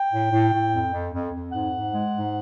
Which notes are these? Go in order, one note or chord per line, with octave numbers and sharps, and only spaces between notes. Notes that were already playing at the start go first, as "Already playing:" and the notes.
Already playing: G5
A2
A2
A2
F2
F2
F2
F2
G#2 F#5
G#2
G#3
G#2